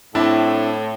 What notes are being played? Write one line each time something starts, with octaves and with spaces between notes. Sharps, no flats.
A2 C4 D4 E4